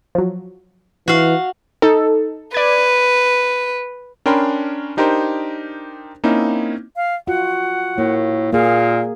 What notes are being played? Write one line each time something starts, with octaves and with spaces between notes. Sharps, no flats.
F3 F#3
E3 F#4 F5
D#4 A4
B4 D5 G#6
C#4 D4 A#4 G5 B5 C6
D4 D#4 G4 A#4 C5
A#3 C4 C#4 D#4 E4
F5
F4 F#4 F#5
A2 A#3
A#2 A#3 G#4 F5